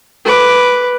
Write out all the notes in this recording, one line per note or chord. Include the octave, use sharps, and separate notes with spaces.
B4 D6